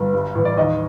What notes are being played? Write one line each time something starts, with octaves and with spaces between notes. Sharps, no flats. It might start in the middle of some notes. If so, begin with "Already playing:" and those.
Already playing: G1
G2
A1
D5
D#2 D#5